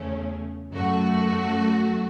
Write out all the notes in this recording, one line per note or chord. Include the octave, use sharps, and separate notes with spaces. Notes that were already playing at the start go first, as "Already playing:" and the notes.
Already playing: E2 C#3 A3 C#4
F#2 F#3 A3 F#4